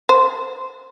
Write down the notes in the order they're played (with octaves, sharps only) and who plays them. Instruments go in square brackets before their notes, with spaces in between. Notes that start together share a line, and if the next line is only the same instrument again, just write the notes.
[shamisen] C5